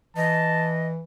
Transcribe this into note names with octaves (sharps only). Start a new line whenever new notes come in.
E3 D#5 A5